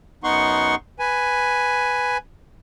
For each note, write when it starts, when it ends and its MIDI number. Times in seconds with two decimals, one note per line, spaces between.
0.24 0.75 42
0.24 0.75 59
0.24 0.75 63
0.24 0.75 78
0.24 0.75 84
0.24 0.75 85
0.99 2.17 71
0.99 2.17 80